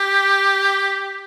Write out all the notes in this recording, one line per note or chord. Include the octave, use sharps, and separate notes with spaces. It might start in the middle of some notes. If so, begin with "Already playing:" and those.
Already playing: G4